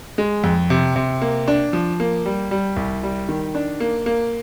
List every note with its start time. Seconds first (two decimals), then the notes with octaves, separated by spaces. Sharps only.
0.18 G#3
0.44 F2
0.70 C3
0.96 C3
1.22 A#3
1.48 D4
1.73 F3
2.00 A#3
2.26 G3
2.51 G3
2.77 C2
3.03 G3
3.29 D#3
3.55 D4
3.80 A#3
4.06 A#3